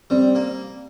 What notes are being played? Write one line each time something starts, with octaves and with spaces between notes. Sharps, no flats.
G3 C4
A#3